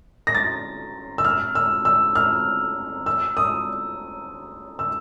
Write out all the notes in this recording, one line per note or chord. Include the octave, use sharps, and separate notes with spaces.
A#6
A6
E6
F6
E6
E6
F6
E6
D#6
E6